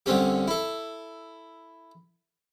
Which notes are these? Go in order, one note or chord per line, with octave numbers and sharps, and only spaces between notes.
C2 D3 C4 C#4 G4
E4 A4